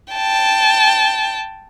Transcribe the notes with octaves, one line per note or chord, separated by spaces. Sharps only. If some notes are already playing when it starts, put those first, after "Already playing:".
G5 A5